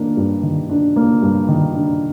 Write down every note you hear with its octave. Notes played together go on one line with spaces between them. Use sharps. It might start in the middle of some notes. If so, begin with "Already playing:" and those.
Already playing: D#3 A#3 D4
G2
D#3
D4
A#3
G2
D#3
D4